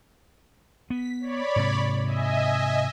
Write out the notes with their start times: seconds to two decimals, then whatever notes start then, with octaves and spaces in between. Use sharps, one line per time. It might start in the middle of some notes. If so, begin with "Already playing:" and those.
0.90 B3 B6
1.20 C#5 D5 B5
1.56 G#2 C3
2.05 D#5 E5 G#5